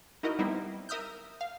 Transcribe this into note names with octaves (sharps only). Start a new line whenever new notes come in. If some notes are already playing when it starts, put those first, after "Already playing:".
D#4 E4 F#4 A#4 D#5
G3 B3 C4 D#4 E4
A#4 E5 D#6 F6 G6
F5